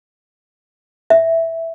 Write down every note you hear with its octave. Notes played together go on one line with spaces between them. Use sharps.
E5